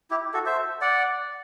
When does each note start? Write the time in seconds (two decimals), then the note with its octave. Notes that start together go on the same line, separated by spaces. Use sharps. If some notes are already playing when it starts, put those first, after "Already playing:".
0.10 E4 G4
0.34 F#4 A4
0.46 C5 E5
0.81 D5 F#5